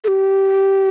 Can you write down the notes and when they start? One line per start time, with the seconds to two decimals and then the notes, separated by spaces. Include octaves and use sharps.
0.04 A4
0.08 G4